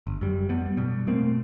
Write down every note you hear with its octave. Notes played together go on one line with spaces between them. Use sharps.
G1
F#2 G3
F2 G3 B3
B2 G3
B2 A3 A#3 C4